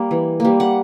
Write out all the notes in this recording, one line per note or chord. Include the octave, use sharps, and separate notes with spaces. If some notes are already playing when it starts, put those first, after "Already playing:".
Already playing: G3 A#3
E3
G3 A#3
F#5